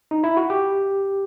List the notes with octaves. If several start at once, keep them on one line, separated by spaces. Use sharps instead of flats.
D#4
E4
F#4
G4